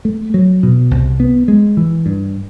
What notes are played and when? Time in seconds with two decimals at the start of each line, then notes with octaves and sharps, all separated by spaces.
0.05 A3
0.34 F#3
0.63 B2
0.91 C2
1.20 B3
1.48 G#3
1.77 E3
2.06 G2